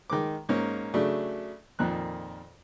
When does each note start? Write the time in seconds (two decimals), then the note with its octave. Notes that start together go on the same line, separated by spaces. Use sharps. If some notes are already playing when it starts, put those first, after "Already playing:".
0.10 D#3 G#3 D6
0.49 G#2 A#3 C#4
0.94 C#3 F#3 A3 D4
1.79 F2 A#2 D#3 F#6